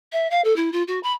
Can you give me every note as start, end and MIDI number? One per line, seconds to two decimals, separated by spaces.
0.12 0.29 76
0.31 0.41 77
0.44 0.55 69
0.56 0.70 64
0.72 0.83 65
0.88 0.99 66
1.03 1.12 83